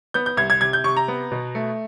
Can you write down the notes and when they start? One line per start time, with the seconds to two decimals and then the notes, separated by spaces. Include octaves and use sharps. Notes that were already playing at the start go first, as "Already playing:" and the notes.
0.14 B3 G6
0.26 G6
0.37 C2 G#6
0.50 G#6
0.61 C3 G#6
0.73 G6
0.84 C3 C#6
0.97 A#5
1.08 B3
1.31 B2
1.55 A3